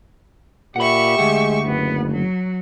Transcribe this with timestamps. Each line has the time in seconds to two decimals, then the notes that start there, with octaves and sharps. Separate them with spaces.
0.76 A#2 G4 E5 F#5 B5 C#6
1.19 D2 G#3 F#5
1.65 F#1 B3
2.10 F#3